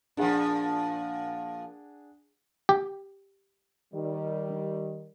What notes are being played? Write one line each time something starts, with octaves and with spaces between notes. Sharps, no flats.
A#2 F3 D4 G#4 F#5
G4
D#3 G3